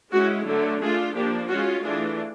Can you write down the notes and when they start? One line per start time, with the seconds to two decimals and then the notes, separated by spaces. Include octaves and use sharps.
0.12 G#3 C#4 E4 F#4
0.46 D3 F#3 A3
0.81 A3 D4 F4 G#4
1.15 F3 A#3 D4 G4
1.49 G#3 C#4 F4 F#4
1.83 E3 A3 D4 F4 G#4